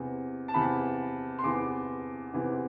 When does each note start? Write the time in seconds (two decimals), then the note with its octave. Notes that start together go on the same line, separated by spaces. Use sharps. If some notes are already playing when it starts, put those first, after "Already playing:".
Already playing: E2 C3 E3
0.48 A5
0.54 E2 C3 E3 B5
1.39 C6
1.44 E2 C3 E3 D6
2.33 E2 C3 E3